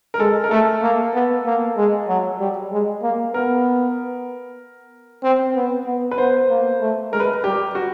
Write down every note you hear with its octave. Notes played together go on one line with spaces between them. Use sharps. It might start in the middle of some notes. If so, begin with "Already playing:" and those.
A#4
G#3 A4
A#4
A3 A4
A#3
B3
A#3
G#3
F#3
G3
G#3
A#3
B3 A#4
C4
B3
B3
B4
B3 C5
A#3
A3
G#3 A#4
B4
A#4
G3 G4
F#4